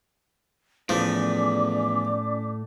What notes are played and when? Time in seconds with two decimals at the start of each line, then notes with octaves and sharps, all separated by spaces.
0.89 E2 A2 F3 A3 C#4 D5 D6